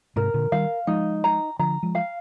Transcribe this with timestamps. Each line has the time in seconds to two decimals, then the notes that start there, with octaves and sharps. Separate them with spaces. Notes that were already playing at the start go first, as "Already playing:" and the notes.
0.16 G#2 C3 A#4
0.34 A#2 D3
0.52 D#3 G3 F5
0.87 F3 G#3 D#4
1.24 A#5
1.59 D3 F3 A#5
1.83 F3 G#3
1.95 F5